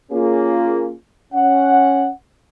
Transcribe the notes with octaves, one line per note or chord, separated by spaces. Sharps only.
A#3 C#4 F4 G#4
C#4 F#5